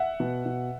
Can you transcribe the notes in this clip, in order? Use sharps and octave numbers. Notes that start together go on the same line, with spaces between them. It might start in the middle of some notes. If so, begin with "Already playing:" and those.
Already playing: E5 F#5
B2
B2